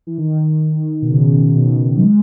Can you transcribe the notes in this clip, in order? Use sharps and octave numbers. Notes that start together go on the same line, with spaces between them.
E3
D#3
B2
C#3
B2
F#3
G#3